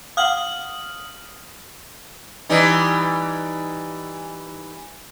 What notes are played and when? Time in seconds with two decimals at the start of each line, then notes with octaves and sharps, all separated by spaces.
0.17 F5 F#5 D6 D#6 F6 F#7
2.50 E3 G3 D#4